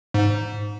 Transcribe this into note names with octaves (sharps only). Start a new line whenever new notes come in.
G#2